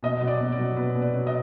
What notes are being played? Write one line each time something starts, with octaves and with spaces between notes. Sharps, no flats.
B2 D#5
F#3
D5
B2
D5
F#3
B2 B4
B2
D5
F#3
D#5